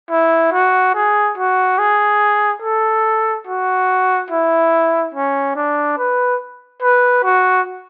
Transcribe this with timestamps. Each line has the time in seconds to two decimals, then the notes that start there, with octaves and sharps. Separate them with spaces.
0.10 E4
0.52 F#4
0.95 G#4
1.37 F#4
1.78 G#4
2.62 A4
3.47 F#4
4.30 E4
5.14 C#4
5.56 D4
5.98 B4
6.82 B4
7.24 F#4